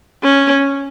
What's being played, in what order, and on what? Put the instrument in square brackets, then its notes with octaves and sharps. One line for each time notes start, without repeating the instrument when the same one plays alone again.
[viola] C#4